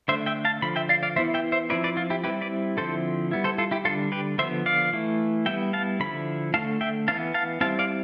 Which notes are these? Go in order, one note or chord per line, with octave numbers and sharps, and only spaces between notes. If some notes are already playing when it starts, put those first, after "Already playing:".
D3 A3 D4 C5 E5
E5 G5
F5 A5
D3 F3 B5
E5 G5
D5 F5
D5 F5
E3 B3 E4 C5 E5
E5 G5
C5 E5
F3 C4 E4 B4 D5
B4 D5
F4
E4 G4
G3 C4 E4 G4 B4
B4 D5
D3 F3 C4 E4 A4 C5
G3 B3 E4
A4 C5
F4 A4
E4 G4
D3 G3 D4 F4 A4
G4 B4
D3 F3 B3 C5 E5
D5 F5
E3 A3 E4
G3 B3 E4 E5 G5
F5 A5
D3 F3 E4 B5
D3 A3 E4 F5 A5
E5 G5
E3 B3 D4 F5 A5
F5 A5
G3 C4 E4 F5 A5
D5 F5